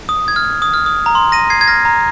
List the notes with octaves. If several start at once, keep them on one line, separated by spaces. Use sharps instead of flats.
D#6
G#6
F6
D#6
F6
D#6
A#5
C6
A#6 D#7
G#6 C7
G#6
F6 A#6
A#5